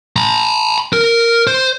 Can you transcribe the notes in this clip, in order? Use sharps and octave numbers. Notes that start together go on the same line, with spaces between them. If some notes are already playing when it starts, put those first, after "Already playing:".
A#5 B5
A#4
C5